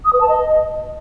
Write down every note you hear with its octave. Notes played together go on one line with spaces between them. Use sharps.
D#6
B4
A5
D#5